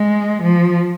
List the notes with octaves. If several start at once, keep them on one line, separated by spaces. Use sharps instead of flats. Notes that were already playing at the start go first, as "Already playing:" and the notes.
Already playing: G#3
F3